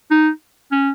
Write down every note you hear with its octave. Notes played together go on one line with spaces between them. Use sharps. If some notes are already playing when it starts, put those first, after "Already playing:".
D#4
C#4